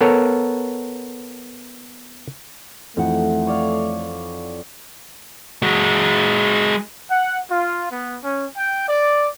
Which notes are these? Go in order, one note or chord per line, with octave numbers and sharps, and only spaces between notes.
B3 A4 A#4 C#5
F2 E3 A3 D#4 F#5
C#5 D5 F5
G#3 F#4
F#5
F4
B3
C#4
G5
D5